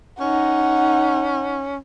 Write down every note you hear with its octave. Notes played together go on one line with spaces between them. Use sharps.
C#4 D#4 F#5